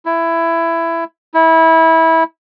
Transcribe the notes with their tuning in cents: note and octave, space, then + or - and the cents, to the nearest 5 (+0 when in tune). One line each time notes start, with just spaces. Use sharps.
E4 +15
E4 -20